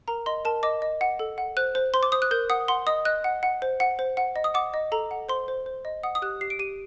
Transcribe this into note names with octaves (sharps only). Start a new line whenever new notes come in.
A#4 A#5
D#5 C6
A#4 A5
D#5 D6
D#5
F#5
A4
F#5
C5 F#6
C5
C5 C6
D6
C5 D#6
F#6
A#4 G6
F#5 D#6
F#5 C6
D#5 D#6
D#5 F#6
F#5
F#5
C5
F#5
C5
F#5
D#5
D#6
F#5 D6
D#5
A4 A#5
F#5
C5 C6
C5
C5
D#5
F#5 D#6
D#6
G4 F#6
G4 C7
D7
G4 D#7